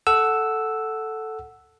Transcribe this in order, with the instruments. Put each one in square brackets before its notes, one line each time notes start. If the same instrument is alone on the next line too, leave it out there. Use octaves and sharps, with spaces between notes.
[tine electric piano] A4 F#5 E6